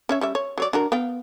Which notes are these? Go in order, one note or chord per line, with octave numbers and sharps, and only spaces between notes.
C#4 C#5 E5
G3 C#4 E5
C#5
F#3 C#5 D5
D4 F#4 A#4
B3 F5 G5